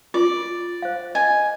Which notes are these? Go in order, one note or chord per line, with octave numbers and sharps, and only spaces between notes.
F4 D5
C5 F5
D#5 G#5